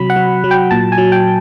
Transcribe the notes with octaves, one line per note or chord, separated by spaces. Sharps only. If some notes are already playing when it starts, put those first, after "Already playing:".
Already playing: C3 F#3 B5
F#5
F#3
F#3
G5
A#2 A5
G#5
F#3
G5